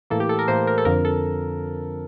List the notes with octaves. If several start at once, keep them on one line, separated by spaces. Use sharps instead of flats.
A2 E3 A#3 A4
G4
A4
A#4
A2 E3 A#3 C5
A#4
A4
F2 D3 F3 A#4
A4